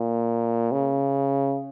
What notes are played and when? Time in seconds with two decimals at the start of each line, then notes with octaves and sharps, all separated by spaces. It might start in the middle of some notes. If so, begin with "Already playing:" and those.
Already playing: A#2
0.72 C#3